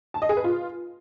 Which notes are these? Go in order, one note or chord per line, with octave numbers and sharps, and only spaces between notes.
A5
D#5
G#4
B4
F4